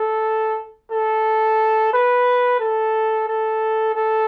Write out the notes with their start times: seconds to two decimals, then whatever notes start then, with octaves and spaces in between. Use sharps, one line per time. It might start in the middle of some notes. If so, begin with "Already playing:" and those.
Already playing: A4
0.91 A4
1.93 B4
2.59 A4
3.28 A4
3.95 A4